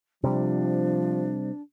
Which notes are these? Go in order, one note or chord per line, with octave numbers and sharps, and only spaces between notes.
C3 F3 G3 D4